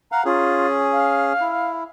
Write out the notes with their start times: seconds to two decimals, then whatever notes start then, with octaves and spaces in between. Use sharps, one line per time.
0.12 F5 F#5 A#5
0.25 C#4 F4 G#4
0.92 F5
1.41 E4